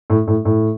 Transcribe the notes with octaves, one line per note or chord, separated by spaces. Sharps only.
A2
A2
A2